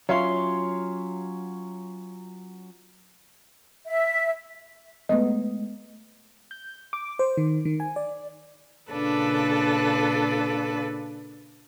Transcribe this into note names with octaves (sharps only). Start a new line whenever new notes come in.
F#3 C#4 F4 C#5 E5 F5 C6
E5
G#3 A3 B3 D#5
G6
D6
C5
D#3
D#3
G#5
D5
A#2 C#3 D4 A4 B4 F#6